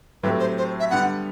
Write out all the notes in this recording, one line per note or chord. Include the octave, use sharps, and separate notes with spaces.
A2 F#3 A3 C4 G4 B4
C5
C5
E5
D3 G3 B3 F#5